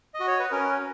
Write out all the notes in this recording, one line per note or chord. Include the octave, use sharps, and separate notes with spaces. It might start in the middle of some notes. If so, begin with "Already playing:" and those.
D#5
F#4
C#5
B4
C#4 A#4